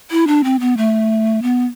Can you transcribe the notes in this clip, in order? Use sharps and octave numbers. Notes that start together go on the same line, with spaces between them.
E4
D4
C4
B3
A3
B3